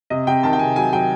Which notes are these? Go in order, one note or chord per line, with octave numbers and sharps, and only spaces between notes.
C3 D#5
C3 G5
D#3 A5
G5
C3 G#5
F#3 G#5
F#3 G5